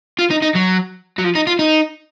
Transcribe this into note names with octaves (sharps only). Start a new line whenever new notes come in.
F4
D#4
D#4
F#3
F#3
F3
D#4
F4
D#4